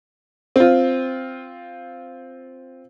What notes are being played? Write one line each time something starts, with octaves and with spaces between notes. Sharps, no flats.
C4 F4